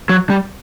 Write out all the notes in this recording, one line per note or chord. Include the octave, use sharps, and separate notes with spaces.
F#3
G3